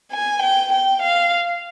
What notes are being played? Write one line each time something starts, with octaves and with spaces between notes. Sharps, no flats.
G#5
G5
G5
F5